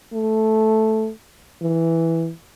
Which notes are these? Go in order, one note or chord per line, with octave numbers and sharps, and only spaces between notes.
A3
E3